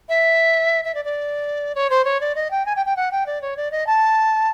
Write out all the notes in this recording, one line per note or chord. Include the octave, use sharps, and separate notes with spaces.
E5
E5
D5
D5
C#5
C5
C#5
D5
D#5
G5
G#5
G5
G5
F#5
G5
D5
C#5
D5
D#5
A5